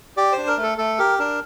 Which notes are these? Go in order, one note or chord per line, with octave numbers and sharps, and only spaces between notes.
G4 D5
C5
D4
A#4
A3
A4
A3 A4
G4 A#4
D4 A#4